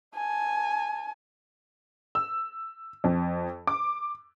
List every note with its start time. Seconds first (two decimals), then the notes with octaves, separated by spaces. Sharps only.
0.16 G#5 A5
2.15 E6
3.04 F2
3.67 D6